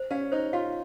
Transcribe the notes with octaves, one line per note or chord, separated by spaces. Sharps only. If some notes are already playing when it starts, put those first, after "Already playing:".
Already playing: C5
C#4 F5
D#4 C5
F4 F5